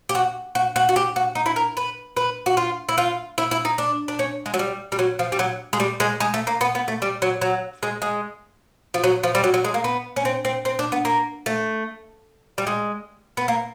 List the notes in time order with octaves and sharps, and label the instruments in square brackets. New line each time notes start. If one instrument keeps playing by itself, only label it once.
[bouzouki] G4
F#4
F#4
F#4
F#4
G4
F#4
D#4
E4
A#4
B4
B4
F#4
F4
E4
F4
E4
E4
D#4
D4
D4
C#4
G#3
F#3
G3
G3
F#3
F3
G3
F#3
G#3
G3
G#3
G#3
A3
A#3
B3
B3
A3
G3
F#3
F#3
G#3
G#3
F3
F#3
F3
G3
F#3
F#3
G#3
A#3
B3
C#4
C4
C4
C4
D4
B3
A#3
A3
G3
G#3
B3
A#3